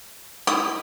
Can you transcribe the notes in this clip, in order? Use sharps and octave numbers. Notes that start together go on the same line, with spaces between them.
D#4 E4 D#6